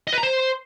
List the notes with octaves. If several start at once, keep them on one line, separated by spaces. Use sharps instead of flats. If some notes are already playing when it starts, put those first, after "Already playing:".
D#5
B4
A#5
C5